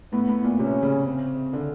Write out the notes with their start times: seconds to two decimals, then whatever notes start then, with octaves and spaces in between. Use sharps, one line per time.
0.13 A2 B3
0.29 A2
0.44 A#2
0.59 C3 C#4
0.83 C#3
1.06 C4
1.53 D3